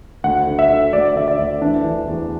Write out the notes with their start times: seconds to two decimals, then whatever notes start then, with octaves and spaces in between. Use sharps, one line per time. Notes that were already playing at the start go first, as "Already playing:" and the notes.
0.24 D2 F#5
0.47 D3
0.59 E5
0.69 D3
0.93 D2 D5
1.16 D3 E5
1.28 D5
1.39 D2
1.62 E3 D4
1.84 E3
2.08 E2